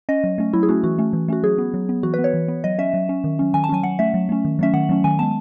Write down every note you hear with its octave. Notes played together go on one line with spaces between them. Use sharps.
C#4 D#5
F#3
A3 C#4
F#3 E4
G#4
A3 C#4 F#4
E3 F#4
A3 C#4
E3
A3 C#4 F#4
F#3 G#4
B3
F#3
B3
E3 F#4
B4
B3
C#5
E3
B3
F#3 D#5
C#4 E5
F#3
C#4
D#3
F#3 C#4
D#3 G#5
A5
F#3 C#4 G#5
F#3 F#5
A3 C#4 E5
F#3
A3 C#4
D#3
F#3 A3 C#4 E5
D#3 F#5
F#3 A3 C#4
D#3 G#5
G#3 B3 A5